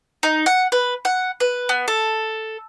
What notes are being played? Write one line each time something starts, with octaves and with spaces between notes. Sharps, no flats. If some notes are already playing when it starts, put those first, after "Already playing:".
D#4
F#5
B4
F#5
B4
B3
A4